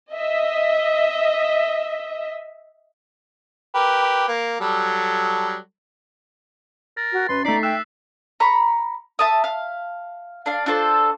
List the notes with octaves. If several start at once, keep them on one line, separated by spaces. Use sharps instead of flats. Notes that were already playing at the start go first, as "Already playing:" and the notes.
D#5 E5
G4 A#4 B4
A#3
F#3 G3 A4
A#4 A6
F#4
F#2 B4 C6
A3 D#4 D5 A#5 B6 C7
E5 G5 E6 F#6 E7
A#5 B5 C#6
E5 A5 D#6
F5
D4 F5
D4 F4 A4 C5